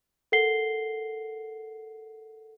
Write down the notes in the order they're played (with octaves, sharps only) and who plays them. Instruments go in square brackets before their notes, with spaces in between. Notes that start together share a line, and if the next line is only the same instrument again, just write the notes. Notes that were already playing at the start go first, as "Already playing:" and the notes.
[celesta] A4 A#4 F#5 C7 G7